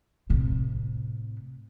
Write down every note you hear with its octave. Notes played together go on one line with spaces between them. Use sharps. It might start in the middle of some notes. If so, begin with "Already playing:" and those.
A2 C3